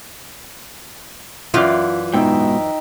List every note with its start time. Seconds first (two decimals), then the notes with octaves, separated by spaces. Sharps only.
1.54 F#2 E3 F4 D5
2.13 G#2 B2 D#4 E5 G5